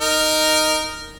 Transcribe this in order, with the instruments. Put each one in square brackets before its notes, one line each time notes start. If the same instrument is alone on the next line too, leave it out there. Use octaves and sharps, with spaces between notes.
[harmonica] D#4 A#4